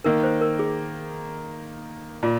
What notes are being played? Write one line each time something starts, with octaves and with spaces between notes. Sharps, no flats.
D#3 A#3 D#4 A#4
C5
A#4
G#4
A#2 F4